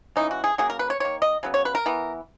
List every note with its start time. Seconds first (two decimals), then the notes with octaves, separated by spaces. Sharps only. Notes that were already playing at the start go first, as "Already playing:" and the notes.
0.16 C#3 E3 G#3 D#4
0.31 F#4
0.44 G#4
0.58 C#3 F#3 A#3 G#4
0.70 A#4
0.79 B4
0.90 C#5
1.00 D#3 A#3 C#5
1.22 D#5
1.43 C#3 F#3 B3
1.54 C#5
1.65 B4
1.75 A#4
1.86 E3 B3